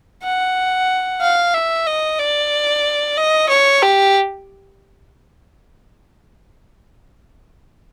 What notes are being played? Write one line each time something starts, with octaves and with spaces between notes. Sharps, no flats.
F#5
F5
E5
D#5
D5
D#5
C#5
G4